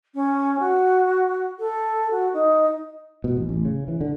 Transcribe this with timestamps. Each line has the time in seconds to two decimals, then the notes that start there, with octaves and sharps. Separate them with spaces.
0.14 C#4
0.59 F#4
1.59 A4
2.10 F#4
2.33 D#4
3.24 B2
3.37 A1
3.49 A1
3.65 C#3
3.88 E3
4.01 D3